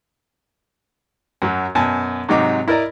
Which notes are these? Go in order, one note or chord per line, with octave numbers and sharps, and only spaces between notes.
F#2 F#3
F#2 B2 G#5 A5
G#2 C3 F#3 D#4 D6
E4 A#4 D5 D#5 A#5